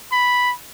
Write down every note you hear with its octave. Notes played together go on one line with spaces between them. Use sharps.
B5